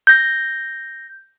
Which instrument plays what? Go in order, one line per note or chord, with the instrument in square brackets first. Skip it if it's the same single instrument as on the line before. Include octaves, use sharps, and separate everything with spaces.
[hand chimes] G6 A#6